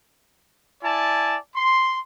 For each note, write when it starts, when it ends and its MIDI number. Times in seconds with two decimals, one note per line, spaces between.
0.84 1.37 64
0.84 1.37 74
0.84 1.37 80
0.84 1.37 81
1.56 1.98 84